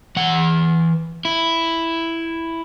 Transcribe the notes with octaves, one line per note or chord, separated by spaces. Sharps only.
E3 F#5
E4